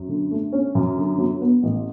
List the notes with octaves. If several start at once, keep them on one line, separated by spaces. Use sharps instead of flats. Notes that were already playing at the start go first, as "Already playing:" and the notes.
Already playing: F#2
D3
A3
C#4
F#2
D3
F#3
B3
A1